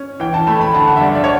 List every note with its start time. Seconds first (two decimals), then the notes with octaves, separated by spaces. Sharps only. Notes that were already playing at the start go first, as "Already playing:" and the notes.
Already playing: C#4
0.20 E3 G5
0.34 A5
0.47 A3 B5
0.61 B5
0.74 D3 A5
0.87 F#5
0.96 E5
1.01 G2 D5
1.15 D5
1.24 C#5